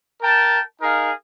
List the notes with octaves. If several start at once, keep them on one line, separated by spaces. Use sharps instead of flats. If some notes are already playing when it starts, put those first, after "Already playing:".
A#4 G5 A5
D#4 G#4 A#4 F5